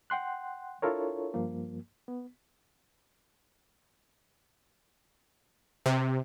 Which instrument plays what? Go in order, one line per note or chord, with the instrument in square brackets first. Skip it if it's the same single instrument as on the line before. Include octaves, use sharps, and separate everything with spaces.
[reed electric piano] F#5 G5 C6 F#6
D4 E4 F4 A4 A#4 C#5
G2 F3 A#3
B3
[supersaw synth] C3